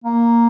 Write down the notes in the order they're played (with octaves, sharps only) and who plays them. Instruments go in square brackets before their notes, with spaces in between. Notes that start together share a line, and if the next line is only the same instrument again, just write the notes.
[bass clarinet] A#3